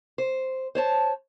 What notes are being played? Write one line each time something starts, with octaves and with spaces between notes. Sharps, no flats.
C5
C5 C#5 A5